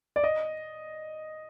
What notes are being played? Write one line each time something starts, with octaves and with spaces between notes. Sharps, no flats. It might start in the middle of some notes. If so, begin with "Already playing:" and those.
D5
D#5